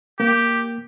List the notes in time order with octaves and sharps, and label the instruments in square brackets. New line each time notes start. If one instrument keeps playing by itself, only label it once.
[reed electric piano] A#3 [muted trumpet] G4